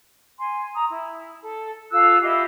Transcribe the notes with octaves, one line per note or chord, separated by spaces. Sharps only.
G#5 C6
A#5 D#6
E4
A4
F4 A4 E6 F#6
E4 F4 G4 D#5